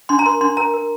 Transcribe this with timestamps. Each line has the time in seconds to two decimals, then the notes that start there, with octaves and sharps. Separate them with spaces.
0.09 D4 C6
0.19 A#5
0.26 A#4 C6
0.41 D4 C6
0.57 A#4 A#5
0.74 A#4